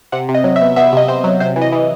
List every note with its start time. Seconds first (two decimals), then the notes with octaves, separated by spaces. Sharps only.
0.12 C3 F#5
0.29 C3
0.35 D#5
0.44 F#3
0.56 E5
0.61 B3
0.76 B3 E5
0.93 C3 D#5
1.08 C3 C5
1.24 F#3
1.40 C3 C5
1.56 E3
1.62 D#5
1.73 E3